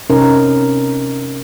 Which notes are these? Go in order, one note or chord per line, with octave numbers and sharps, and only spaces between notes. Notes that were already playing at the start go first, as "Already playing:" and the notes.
C3 C#4 D#4 A#4